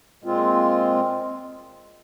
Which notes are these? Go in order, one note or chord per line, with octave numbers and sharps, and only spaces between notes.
A#2 G#3 C4 F4